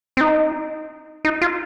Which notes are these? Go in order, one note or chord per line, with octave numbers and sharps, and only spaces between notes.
C4
D#4
D#4
F4